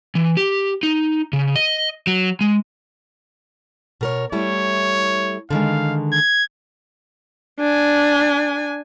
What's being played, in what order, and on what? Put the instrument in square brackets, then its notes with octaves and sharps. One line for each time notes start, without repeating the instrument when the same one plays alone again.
[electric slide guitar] E3
G4
D#4
C#3
D#5
F#3
G#3
[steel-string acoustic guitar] B2 A#4 C#5
[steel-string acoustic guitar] G3 A3 E4 [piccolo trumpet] C#5
[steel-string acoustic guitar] D3 D#3 G#3 [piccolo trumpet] F5
[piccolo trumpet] G#6
[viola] D4 G#5